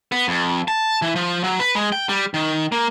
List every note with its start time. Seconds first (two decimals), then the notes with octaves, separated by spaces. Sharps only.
0.12 B3
0.28 F2
0.68 A5
1.02 E3
1.16 F3
1.44 F#3
1.60 B4
1.75 G#3
1.92 G5
2.09 G3
2.34 D#3
2.72 A#3